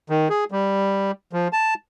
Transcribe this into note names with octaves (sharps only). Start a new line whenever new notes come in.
D#3
G#4
G3
F3
A5